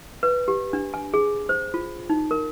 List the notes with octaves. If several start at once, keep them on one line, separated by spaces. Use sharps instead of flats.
B4
G4
D4
G#5
G#4
C5
F4
D#4
A#4